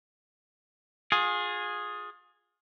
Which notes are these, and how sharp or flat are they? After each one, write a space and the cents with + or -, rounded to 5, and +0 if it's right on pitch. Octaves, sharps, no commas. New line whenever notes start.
F4 +35 G#4 +0